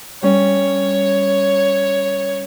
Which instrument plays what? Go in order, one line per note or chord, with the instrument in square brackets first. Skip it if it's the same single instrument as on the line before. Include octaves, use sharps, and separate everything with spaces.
[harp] G3 C#4 [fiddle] C#5